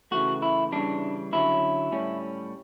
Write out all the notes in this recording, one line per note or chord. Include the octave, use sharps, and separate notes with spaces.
C#3 E3 A3 F#4
E4
C#3 E3 G3 D4
D3 F#3 C#4 E4
A2 G3 C#4